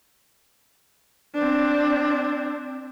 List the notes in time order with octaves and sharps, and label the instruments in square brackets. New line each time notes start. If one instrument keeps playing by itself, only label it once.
[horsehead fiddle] C4 D4